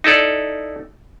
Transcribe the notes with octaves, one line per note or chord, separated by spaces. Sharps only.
D#4 E4 A4 D5